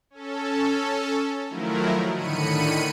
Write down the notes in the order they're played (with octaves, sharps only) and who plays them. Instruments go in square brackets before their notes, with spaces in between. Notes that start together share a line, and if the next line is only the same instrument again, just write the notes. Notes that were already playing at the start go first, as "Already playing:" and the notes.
[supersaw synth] C#4 A4
D#3 F3 F#3 A3 E4 A#4
A2 D3 D#3 B5 C#7 D#7